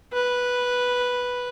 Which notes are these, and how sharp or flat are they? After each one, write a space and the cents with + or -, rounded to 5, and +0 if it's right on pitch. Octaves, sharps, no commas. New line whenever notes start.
B4 -5